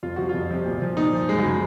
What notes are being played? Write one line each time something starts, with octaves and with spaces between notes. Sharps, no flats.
F2 F4
C3 F3 F#4
F4
F2
C3 F3
A#2
F3
A#2 D#4
F3
F#2 G#3
F#3
C#3 F3 G#3